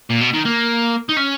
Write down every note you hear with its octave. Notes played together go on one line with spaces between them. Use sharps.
A#2
B2
D#3
A#3
D#4
C#4